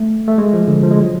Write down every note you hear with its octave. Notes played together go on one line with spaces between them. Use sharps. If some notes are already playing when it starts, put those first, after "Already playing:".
Already playing: A3
A3
G#3
F3
D3
F3
G#3
F#3